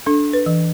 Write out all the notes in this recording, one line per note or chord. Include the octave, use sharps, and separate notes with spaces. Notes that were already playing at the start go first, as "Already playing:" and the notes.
D4 A4
B4
E3